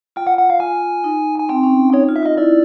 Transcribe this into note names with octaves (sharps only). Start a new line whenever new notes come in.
F4 G5
F#5
F#5
F5
F4 G#5
D#4
G#5
C4 G5
C#4
D#4 C#5
F4
E5
F4
D#5
E4 D5